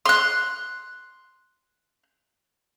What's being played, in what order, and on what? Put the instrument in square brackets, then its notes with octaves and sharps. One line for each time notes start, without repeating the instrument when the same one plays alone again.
[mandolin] C6 F#6